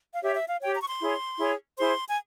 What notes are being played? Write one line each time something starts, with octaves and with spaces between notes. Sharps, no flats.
F5
G4 C#5 E5
E5
F5
G4 C#5 G5
A#5
C#6
C6
E4 G#4 C#5
E4 G#4 C#5
E4 G#4 C5 C6
G#5